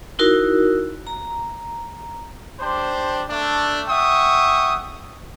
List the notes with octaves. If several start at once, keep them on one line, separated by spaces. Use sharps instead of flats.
D#4 E4 F#4 A#4
A#5
D4 G4 C5
A3 D4
E5 F#5 G5 C#6 D#6